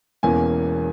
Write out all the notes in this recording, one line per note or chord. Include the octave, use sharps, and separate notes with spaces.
E1 E2 E3 A#3 C#4 G#5